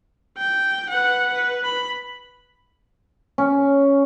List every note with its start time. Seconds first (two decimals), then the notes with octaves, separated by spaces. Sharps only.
0.38 G5
0.90 B4 F#5
1.34 B4
1.64 B5
3.38 C#4